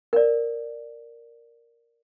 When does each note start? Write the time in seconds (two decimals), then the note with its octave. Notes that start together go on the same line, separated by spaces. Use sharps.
0.13 A#4 D5